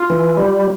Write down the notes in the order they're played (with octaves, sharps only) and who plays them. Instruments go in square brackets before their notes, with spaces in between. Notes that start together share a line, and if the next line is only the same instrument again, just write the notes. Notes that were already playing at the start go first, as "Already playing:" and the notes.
Already playing: [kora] F4
[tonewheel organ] E3
G3